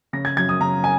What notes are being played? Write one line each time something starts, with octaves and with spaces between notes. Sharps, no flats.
C#3 A#6
G#6
F#2 G#6
D#6
C#3 A#5
G#5